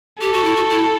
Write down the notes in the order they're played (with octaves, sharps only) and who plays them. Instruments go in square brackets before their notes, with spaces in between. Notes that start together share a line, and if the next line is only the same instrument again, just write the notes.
[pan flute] G4 [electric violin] A4
[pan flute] F#4
E4
F#4
E4